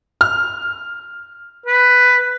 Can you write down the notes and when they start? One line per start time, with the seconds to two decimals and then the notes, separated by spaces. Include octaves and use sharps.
0.21 F6
1.66 B4